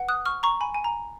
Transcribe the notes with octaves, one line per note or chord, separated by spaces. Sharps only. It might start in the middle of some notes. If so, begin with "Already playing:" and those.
Already playing: B4 F#5
D#6 F#6
C#6 F6
A#5 C#6
G#5 B5
G#5
A#5